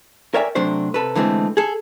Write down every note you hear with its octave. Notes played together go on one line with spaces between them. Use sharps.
A#4 C#5 D5 E5 G5 G#5
C3 F#3 A3 D4 C5
C3 A4 B4
D3 E3 G#3 A3 C4
G#4 A4